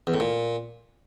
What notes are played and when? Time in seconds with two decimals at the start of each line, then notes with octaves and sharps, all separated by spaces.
0.07 E2
0.14 A2
0.20 A#2